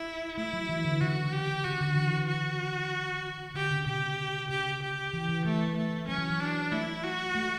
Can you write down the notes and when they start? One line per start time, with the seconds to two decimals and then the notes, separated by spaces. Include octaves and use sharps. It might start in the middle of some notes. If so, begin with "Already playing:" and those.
Already playing: E4
0.37 A3 E4
0.53 F#3
0.69 E3
0.85 D3
1.00 C#3 F#4
1.32 G4
1.64 C#3 F#4
1.80 D3
1.96 E3
2.27 F#4
3.54 D3 G4
3.71 C#3
3.86 B2 G4
4.49 C#3 G4
4.82 G4
5.14 E3
5.29 E3
5.45 E3 A3
5.77 A3
6.08 F#3 C#4
6.19 E3
6.30 F#3
6.40 D4
6.72 A3 E4
7.03 F#4
7.35 A3